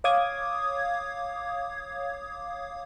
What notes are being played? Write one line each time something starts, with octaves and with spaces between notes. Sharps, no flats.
C#5 F5 D6 D#6 G#6